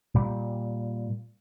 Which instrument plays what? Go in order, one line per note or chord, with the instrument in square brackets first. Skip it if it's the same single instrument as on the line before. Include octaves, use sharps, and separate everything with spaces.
[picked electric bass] A#2 G3